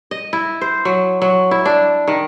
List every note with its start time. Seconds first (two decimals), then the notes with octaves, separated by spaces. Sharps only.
0.11 D#5
0.33 E4
0.61 C5
0.85 F#3
1.22 F#3
1.51 E4
1.65 D4
2.08 D#3